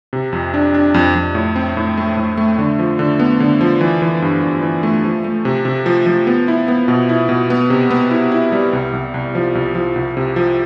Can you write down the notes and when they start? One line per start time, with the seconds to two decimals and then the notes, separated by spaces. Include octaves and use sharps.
0.13 C3
0.33 F2
0.54 D4
0.74 D4
0.94 F2
1.15 F2
1.35 A2
1.56 C4
1.77 A2
1.97 A3
2.17 A2
2.37 A3
2.58 D3
2.79 F3
2.99 D3
3.19 B3
3.40 D3
3.61 F3
3.81 E3
4.02 E3
4.22 G2
4.42 G2
4.63 E3
4.83 A3
5.04 F3
5.24 A3
5.45 C3
5.65 C3
5.86 F3
6.06 F3
6.27 B3
6.48 E4
6.68 B3
6.88 B2
7.09 E4
7.29 B2
7.50 B3
7.70 C3
7.91 B3
8.11 E4
8.32 E4
8.52 G3
8.73 C2
8.93 C2
9.14 C2
9.35 F3
9.55 C2
9.75 F3
9.96 C2
10.17 C3
10.36 F3